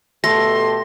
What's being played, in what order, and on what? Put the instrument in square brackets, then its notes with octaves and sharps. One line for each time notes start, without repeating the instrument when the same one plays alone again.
[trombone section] B2 G4 A4 [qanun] A3 [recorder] C6 [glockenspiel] A#6